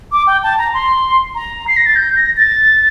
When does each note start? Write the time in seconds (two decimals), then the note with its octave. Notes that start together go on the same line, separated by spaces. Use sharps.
0.12 D6
0.27 G5
0.43 A5
0.58 A#5
0.74 C6
1.35 A#5
1.68 C7
1.77 A#6
1.86 A6
1.96 G6
2.16 A#6
2.37 A6